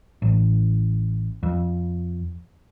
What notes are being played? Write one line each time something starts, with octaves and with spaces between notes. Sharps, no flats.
A1
F2